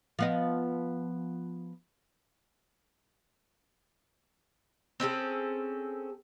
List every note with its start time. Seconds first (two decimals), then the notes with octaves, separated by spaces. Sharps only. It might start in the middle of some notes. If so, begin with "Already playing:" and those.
0.19 F3 B3 D#5
5.00 C4 C#4 G#4 A4